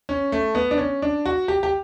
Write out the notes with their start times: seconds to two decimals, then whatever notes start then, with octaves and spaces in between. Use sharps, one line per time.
0.09 C#4
0.32 A3
0.55 B3
0.71 D4
0.78 C#4
1.02 D4
1.26 F#4
1.48 G4
1.63 G4